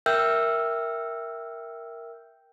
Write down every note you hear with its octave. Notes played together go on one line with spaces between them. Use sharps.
A#4 E5 G5 E6 F6 G6